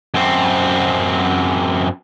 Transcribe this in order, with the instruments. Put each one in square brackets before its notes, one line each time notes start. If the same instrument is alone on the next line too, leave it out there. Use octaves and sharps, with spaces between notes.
[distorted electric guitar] F#2 C4